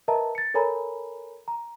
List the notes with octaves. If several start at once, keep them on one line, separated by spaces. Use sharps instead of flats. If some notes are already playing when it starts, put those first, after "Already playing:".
A#4 B4 D#5 E5 A5 A#5
A6 C#7
A4 A#4 C#5 G#5 A#5 B5
A#5